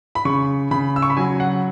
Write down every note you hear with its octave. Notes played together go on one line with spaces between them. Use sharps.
B5
C#3 C#6
C#3 B5
E6
C#6
B5
F#3 G#5
F#5